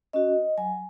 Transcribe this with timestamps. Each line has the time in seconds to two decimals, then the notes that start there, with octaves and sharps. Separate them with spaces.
0.13 C#4 F#4 D#5
0.58 F#3 G#5